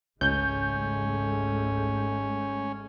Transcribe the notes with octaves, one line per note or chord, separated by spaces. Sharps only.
G#1 C#2 G#3 A3 C#4 G6